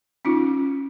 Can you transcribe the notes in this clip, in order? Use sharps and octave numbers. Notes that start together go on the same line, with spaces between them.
C#4 D#4 F4